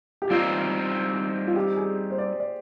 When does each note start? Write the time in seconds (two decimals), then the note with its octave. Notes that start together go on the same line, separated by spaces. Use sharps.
0.22 G4
0.30 G3 C4 D#4 F4
1.47 F4
1.56 G4
1.77 G#4
2.11 C5
2.18 D5
2.40 D5